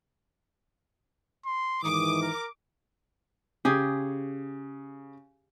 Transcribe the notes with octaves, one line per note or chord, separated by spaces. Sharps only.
C6
G#2 D#3 E3 D6 D#6
A#4
C#3 G4 G#4